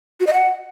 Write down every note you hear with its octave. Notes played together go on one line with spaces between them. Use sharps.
F#4
D#5
F#5